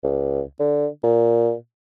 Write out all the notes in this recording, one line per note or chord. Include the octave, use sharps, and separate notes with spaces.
C#2
D3
A#2